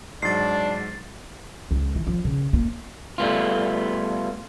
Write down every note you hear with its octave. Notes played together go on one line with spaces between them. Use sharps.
G#2 F#3 D4 A6 C7
C#2
E3
F3
C#3
A#3
G3 A3 B3 F4